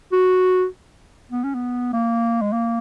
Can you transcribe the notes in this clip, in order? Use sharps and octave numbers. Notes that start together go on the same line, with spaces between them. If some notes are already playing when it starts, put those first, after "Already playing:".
F#4
B3
C#4
B3
A#3
G#3
A#3